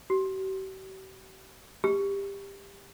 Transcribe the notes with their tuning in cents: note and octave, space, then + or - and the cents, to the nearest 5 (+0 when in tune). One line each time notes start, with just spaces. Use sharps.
G4 -45
G4 +20